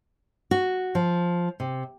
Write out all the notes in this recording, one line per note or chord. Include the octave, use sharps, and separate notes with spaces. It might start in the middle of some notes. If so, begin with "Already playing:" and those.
F#4
F3
C3